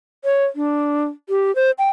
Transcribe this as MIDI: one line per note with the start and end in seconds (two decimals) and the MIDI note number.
0.25 0.45 73
0.56 1.04 62
1.29 1.54 67
1.56 1.71 72
1.79 1.90 79